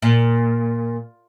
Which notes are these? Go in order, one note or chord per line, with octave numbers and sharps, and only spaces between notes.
A#2